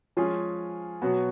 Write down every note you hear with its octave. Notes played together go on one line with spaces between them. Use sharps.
F3 G#3 C#4 F4 G#4
B2 F#3 B3 F#4